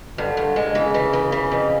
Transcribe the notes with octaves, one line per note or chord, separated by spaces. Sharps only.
G2 D3
G2
G#3
C#3 E3
E3
E3
E3
F2